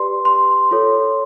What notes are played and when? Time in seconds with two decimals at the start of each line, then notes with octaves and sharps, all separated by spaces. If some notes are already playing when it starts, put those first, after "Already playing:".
Already playing: G4 B4 D5 C6
0.25 C6
0.71 F4 A4 C#5